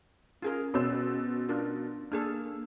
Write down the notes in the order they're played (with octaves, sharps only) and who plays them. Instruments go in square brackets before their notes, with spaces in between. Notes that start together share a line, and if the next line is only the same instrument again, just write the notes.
[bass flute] C#4 [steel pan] F4 G#4 A#4
[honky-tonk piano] B2 C5 E6
[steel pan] D4 F4 A#4
[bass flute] A#3 [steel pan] D4 G#4 A4 [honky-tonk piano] F6